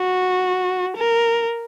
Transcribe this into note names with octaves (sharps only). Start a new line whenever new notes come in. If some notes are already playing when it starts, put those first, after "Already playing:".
Already playing: F#4
A#4